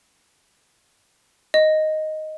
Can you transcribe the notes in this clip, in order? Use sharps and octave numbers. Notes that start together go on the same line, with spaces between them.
D#5